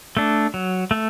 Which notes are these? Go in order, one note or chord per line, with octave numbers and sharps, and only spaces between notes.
A3 D4
F#3
A3